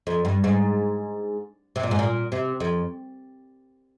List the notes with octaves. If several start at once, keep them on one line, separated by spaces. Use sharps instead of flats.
F2
G2
G#2
C3
A#2
G#2
A#2
C3
F2